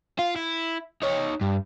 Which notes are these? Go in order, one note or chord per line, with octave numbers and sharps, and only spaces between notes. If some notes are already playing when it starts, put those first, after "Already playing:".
F4
E4
D#4 C#5
G2